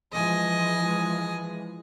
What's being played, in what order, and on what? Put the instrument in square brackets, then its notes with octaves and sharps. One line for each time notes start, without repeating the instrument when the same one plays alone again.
[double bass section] E3 F3 G#3 [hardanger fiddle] D#5 G#5